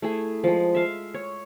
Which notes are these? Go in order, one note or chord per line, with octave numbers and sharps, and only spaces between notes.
A3 E4 G#4
F3 G#3
E5 F5
C#5